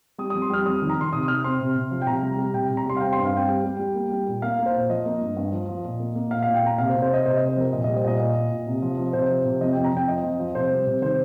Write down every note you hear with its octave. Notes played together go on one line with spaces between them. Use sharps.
G3 D#6
F2 D#6
C6
G3 F6
F2 D#6
D#3
A#5
D#3 C6
C3 D#6
C3 F6
C4 C6
C3
C3
F3
G5
C3 A#5
G3
G3
C3 G5
C3
A#5
G3 C6
F5
C4 G5
G2 C6
F5
C4 G5
G3
G3
G3
A#3
G3
A#2
A#3 F5
A#3
C5
A#2
F3 D#5
A#3
G2
G2
F3
F3
A#2
A#3
A#3
A#2 F5
A#2 F5
G5
A#3 A#5
C3 F5
C5
C3
C5
C4 D#5
C3 C5
C3 D#5
C5
F2 A#4
A#2 D#5
G3 D#5
C5
A#2 D#5
A#2
A#2
A#2
C3
F3
F3
C3 C5
F3
C3
F2 D#5
F2 G5
A#5
F2 G5
F3 D#5
F2
F3
C3 C5
G3
C3
D#3 C5